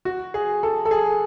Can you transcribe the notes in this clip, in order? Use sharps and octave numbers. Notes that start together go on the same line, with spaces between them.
F#4
G#4
A4
A4
G#4